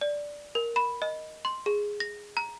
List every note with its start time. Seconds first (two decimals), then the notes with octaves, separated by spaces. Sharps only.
0.01 D5
0.55 A#4
0.76 B5
1.02 D#5
1.45 C6
1.66 G#4
2.00 A#6
2.37 A#5